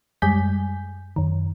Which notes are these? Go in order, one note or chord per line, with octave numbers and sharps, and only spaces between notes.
F#2 G3 G#3 G#5 G6 B6
F#2 D#3